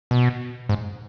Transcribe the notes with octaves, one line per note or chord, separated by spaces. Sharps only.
B2
G#2